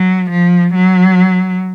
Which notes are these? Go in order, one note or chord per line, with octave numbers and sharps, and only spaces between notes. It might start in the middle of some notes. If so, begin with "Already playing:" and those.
Already playing: F#3
F3
F#3